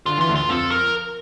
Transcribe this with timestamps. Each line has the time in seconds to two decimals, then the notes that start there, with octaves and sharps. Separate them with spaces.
0.06 D3 F4
0.18 E3 F4
0.29 D2 D3
0.36 F4
0.49 F2 F3 A4
0.71 A#4